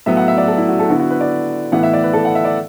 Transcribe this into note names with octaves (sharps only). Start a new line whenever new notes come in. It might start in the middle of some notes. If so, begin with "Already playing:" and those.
A2 F#3 B3 E5
F#5
E5
D5
A4
E4
F#4
A4
D3 B3 E4 F#4
F#4
B4
D5
A2 E3 B3 E4 F#5
E5
D5
B4
A4
F#5
E5
D5